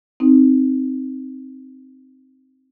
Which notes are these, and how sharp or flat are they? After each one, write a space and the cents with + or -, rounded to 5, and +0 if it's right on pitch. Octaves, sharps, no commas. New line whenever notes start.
C4 +0 D#4 +0